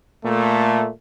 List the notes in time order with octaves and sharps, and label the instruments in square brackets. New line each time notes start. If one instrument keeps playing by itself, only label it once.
[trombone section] A#2 A3